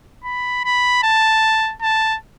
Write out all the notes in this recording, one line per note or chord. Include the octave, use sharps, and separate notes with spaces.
B5
B5
A5
A5